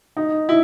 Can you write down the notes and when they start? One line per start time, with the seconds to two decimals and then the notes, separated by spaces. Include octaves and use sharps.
0.17 D#4
0.49 E4